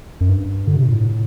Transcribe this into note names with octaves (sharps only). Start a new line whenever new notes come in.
F#2
G2
D3
C3
A#2
A2